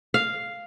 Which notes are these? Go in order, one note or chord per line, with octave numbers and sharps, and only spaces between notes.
F5